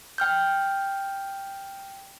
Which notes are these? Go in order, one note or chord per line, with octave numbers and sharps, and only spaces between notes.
G5 F6 G6